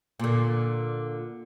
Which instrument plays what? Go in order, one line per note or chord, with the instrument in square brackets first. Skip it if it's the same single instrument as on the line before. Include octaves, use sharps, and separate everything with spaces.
[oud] A#2 D3